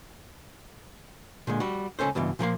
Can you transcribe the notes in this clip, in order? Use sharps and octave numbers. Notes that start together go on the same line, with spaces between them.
A#2 D3 G#3
G3 F#4
C#2 C#4 A4 C5
C#2 G2 B2 E3
A#2 F3 A#3 C6